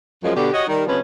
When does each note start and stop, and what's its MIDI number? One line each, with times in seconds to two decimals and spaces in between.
0.24 0.31 42
0.24 0.31 53
0.24 0.31 56
0.35 0.50 47
0.35 0.50 50
0.35 0.50 67
0.53 0.66 66
0.53 0.66 67
0.53 0.66 73
0.53 0.66 75
0.68 0.84 51
0.68 0.84 55
0.87 0.99 48
0.87 0.99 53
0.87 0.99 56
0.87 0.99 59
0.87 0.99 61
0.87 0.99 71